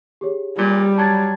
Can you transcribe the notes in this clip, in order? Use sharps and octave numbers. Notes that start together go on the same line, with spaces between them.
G4 G#4 C#5
A#2 G3
F#3 A5 G#6 A6